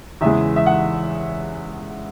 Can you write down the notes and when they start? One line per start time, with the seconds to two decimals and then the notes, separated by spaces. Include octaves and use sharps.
0.21 E2 C#3 E3 G#3 E5
0.56 E5
0.66 F#5